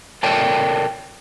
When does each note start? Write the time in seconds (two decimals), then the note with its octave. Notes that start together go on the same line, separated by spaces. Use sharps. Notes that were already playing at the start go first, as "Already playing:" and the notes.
0.23 A4 A#4 C#5 D5 G5 A5